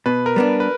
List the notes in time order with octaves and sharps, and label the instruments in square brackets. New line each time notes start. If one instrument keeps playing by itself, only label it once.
[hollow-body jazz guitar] B2 [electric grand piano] B4
[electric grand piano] A#4
[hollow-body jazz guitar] G3 B3 D4
[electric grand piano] B4